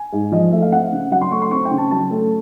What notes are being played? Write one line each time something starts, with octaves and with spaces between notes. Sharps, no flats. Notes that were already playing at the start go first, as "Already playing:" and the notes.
Already playing: G#5
G#2
F3 D#5
A3 E5
F5
C4 F#5
C#3
F#3 F#5
C6
A3 C#6
C6
C4 C#6
G5
C#3
A5
F#3 A5
A3